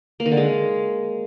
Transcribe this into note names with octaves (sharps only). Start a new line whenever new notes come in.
A#3
D#3
D3
G#3